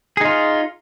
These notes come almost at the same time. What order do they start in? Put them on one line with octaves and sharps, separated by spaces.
G#4 D#4 F4